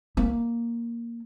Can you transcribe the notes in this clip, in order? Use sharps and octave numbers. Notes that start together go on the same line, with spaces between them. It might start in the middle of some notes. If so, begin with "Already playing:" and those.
A#3